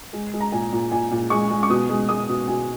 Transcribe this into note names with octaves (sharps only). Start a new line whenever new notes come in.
G#3
G#3
A#5
A#2 G#5
A#2
A#2 G#5
A#2
G#3 C#6
G#3
C#6
B2 D#6
G#3
G#3 D#6
B2
B2 G#5